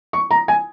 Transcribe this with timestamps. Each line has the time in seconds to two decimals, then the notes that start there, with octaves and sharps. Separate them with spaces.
0.13 C#6
0.31 A#5
0.48 G#5